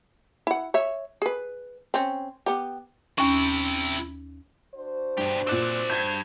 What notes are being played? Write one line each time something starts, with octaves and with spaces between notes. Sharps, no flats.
E4 F#5
C#5 E5
G#4 B4
C4 C#4
B3 G4
D#2 C3 C#4 E4
D4 F#4 C5
G2 B2 G4
A#2 C4 D5 F#6 E7
G2 G6 G#6